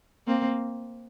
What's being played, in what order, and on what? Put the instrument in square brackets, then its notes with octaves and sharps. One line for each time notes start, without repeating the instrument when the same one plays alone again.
[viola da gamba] A#3 C4